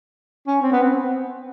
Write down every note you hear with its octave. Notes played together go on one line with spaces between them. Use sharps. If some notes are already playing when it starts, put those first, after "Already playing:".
C#4
C4
B3
C4